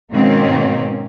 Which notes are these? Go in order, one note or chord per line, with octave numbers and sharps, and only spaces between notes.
G#2 B2 D#3 A#3 C4 C#4